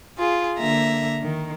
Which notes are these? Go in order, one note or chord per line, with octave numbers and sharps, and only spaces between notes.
F4 G#4
D3 A#3 E5 A#5
D#3